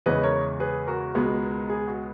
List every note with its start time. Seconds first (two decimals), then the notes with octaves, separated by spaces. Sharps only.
0.06 E2 C#3 E3 G#3 C#4 B4 D#5
0.23 A#4 C#5
0.60 G#4 B4
0.87 F#4 A#4
1.15 C#2 B2 G#3 B3
1.69 G#4
1.88 F#4